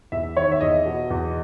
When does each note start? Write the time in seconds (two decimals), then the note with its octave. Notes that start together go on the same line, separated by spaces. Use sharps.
0.12 E2 E5
0.36 D#3 C#5
0.51 E5
0.61 E2 D#5
0.85 B2
1.10 E2